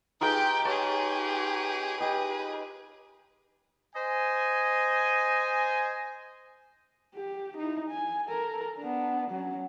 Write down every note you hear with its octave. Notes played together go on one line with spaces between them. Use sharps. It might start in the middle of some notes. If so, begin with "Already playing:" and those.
D#4 F4 G4 G#4 B4 G5
G4 G#4 B4 C#5 A5
G4 G#4 B4 D#5
C5 D#5 G#5
G4
D#4 E4
G#5
A4 A#4
B3 D4
F#3 C#4